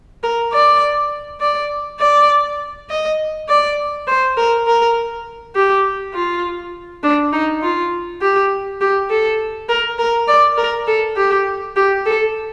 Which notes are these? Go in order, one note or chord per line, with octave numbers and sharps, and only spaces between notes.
A#4
D5
D5
D5
D#5
D5
C5
A#4
A#4
G4
F4
D4
D#4
F4
G4
G4
A4
A#4
A#4
D5
A#4
A4
G4
G4
A4